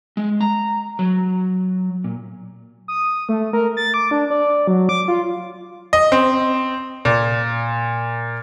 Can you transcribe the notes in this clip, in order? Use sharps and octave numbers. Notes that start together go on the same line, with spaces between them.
G#3
A#5
F#3
A#2
D#6
A3
A#4
A6
D6
D4
D5
F#3
D6
F4
D#5
C4
A#2